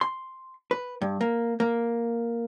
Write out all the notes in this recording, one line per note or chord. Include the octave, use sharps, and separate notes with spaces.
C6
B4
G2
A#3
A#3